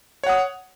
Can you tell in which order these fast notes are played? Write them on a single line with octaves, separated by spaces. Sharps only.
C#5 F#5 D#6